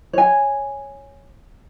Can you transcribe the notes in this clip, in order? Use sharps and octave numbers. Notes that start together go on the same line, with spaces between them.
C#5 G#5